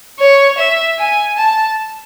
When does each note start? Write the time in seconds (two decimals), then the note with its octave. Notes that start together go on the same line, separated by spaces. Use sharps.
0.19 C#5
0.58 E5
0.99 G#5
1.38 A5